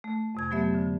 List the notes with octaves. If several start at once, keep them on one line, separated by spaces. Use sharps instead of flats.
A3
F2 C3 G#6
F#3 A3 B3 G4 E5
D3